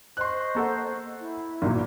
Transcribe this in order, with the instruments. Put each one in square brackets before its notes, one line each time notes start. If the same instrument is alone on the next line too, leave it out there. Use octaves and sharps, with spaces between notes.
[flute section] C5 D#5 C#6 [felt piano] C6 F#6
[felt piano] A#3 A4 F#5
[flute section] E4
[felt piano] G#1 A#2 F#3